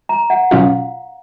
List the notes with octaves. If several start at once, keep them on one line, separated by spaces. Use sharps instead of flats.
A#5
F#5
B2 F#3 C#4 F4 F5